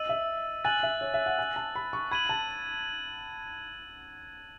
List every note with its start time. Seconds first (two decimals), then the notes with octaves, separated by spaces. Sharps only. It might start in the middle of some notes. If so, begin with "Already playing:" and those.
Already playing: D#5 E6 A6 D#7 F#7
0.09 E5
0.64 G#5 F#6 A6 D#7 F#7
0.83 E5
1.01 C#5
1.14 E5
1.26 F#5
1.39 G#5
1.56 A5
1.75 B5
1.93 C#6
2.11 B5 G#6 D#7 F#7
2.29 A5